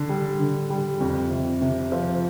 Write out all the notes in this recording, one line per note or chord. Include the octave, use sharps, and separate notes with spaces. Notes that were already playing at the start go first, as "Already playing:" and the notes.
Already playing: D3
G3
D3
G3
F2
C3
C3
F3